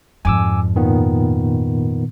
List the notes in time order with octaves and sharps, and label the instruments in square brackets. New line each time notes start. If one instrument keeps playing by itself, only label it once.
[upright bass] F2 G#2 [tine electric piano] G#5 D6 E6
[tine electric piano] A#2 D#3 B3